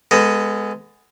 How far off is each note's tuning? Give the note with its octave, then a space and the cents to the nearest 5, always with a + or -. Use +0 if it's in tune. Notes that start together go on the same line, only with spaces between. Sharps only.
G#3 +0 B3 +15 A4 +30